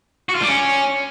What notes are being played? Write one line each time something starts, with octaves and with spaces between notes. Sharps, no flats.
F#4
F4
G3
C#4